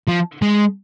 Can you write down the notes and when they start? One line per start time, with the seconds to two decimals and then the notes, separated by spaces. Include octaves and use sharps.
0.08 F3
0.42 G#3